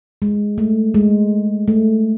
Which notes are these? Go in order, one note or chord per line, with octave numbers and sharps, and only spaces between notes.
G#3
A3
G#3
A3